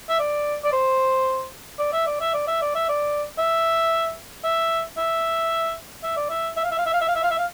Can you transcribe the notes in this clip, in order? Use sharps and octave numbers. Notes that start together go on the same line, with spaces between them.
E5
D5
D5
C5
D5
E5
D5
E5
D5
E5
D5
E5
D5
E5
E5
E5
E5
D5
E5
E5
F5
E5
F5
E5
F5
E5
F5
E5
F5
E5
F5